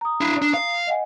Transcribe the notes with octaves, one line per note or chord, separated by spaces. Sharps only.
A#5 D#6
D4 E4
D4
F5
D#5 F#5 G#5